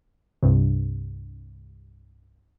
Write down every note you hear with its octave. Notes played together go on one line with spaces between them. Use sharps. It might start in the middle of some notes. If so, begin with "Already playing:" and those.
C2 G2 C3